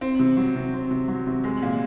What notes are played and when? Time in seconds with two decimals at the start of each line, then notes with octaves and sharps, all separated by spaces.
0.01 C4
0.19 C3
0.37 F#3
0.55 C3
0.73 C4
0.91 C3
1.08 F#3
1.27 C3
1.44 G#3
1.62 A#2